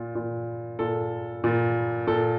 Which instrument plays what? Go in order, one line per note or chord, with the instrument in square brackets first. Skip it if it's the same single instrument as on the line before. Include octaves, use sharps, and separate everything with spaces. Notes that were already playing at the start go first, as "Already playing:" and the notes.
Already playing: [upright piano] A#2
A#2
A#2 A4
A#2
A#2 A4